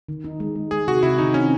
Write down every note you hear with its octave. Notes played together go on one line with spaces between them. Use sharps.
D#3
D#4
G#3
G#3
G#3 G#4
C3 F#4
C3 E4
D#3 D#4
C4 C#4